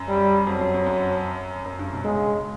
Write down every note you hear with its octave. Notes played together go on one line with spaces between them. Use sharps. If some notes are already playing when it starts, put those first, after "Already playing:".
Already playing: F#2
G3
F2 F#3
F#2
F2
F#2
F#2
G2
B2
C#3 G#3